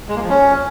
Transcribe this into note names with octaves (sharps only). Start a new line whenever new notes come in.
G#3
A#3
F3
C#4